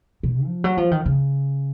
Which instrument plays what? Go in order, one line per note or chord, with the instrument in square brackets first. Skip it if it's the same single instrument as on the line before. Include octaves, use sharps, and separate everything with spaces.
[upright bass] B2
F3
F#3
F3
D#3
C#3